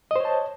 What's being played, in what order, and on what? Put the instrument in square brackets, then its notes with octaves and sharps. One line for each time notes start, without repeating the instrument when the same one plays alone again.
[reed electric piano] D#5
C5
C#5
A5